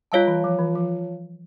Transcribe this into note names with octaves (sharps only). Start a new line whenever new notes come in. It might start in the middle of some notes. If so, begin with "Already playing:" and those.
G3 F4 C#5 F5 A5
E3
F3
E3
F3